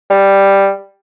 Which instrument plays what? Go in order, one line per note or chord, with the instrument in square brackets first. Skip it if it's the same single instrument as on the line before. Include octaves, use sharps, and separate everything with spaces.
[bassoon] G3